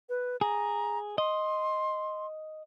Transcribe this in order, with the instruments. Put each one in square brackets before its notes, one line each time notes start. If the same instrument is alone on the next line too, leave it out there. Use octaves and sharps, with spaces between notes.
[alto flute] B4
[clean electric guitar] G#4 [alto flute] A#5
[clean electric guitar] D#5 [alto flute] C6